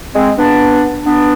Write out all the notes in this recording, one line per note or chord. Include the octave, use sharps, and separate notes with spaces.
G#3 C4
B3 D4
B3 D4